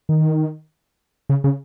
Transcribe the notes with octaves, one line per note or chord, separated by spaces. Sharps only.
D#3
C#3
C#3